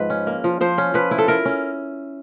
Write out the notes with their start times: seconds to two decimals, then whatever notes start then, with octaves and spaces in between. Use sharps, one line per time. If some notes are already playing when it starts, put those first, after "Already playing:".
Already playing: G#2 F3 B4
0.10 C#4
0.27 A#3
0.44 F3
0.61 F3 C5
0.78 C#4
0.94 F3 B4
1.11 E4
1.18 A4
1.28 E4 A#4
1.45 C#4